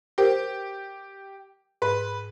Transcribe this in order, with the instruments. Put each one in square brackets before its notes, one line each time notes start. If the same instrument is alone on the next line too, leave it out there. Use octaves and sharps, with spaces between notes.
[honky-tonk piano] G4 [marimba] A#4 C5
[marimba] G#2 [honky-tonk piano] B4